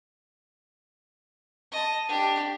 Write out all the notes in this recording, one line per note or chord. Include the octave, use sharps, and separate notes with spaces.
D#5 A5
D4 G4